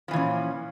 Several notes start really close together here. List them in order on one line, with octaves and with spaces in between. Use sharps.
F3 E3 A#2 C#4